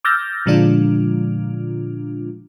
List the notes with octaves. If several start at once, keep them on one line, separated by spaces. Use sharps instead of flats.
D6 E6 F6 G6 A6 A#6
A#2 D3 F3 G#3 D4 F4